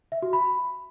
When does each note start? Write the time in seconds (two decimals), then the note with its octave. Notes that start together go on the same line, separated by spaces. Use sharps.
0.12 E5
0.22 F#4
0.33 B5